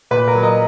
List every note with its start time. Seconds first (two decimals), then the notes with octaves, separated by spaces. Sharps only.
0.11 A#2 B4
0.28 A#4
0.35 F#3
0.43 D#5